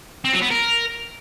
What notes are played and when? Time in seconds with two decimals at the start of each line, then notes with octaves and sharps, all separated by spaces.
0.25 C4
0.33 F#3
0.42 B3
0.51 A#4